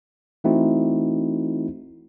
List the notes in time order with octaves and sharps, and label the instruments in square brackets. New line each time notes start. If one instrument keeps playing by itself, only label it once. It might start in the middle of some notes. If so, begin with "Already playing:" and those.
[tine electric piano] E3 A3 C4 D#4 E4 F#4